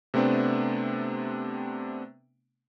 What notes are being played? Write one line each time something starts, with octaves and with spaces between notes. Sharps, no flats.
C3 A3 B3 C4 D4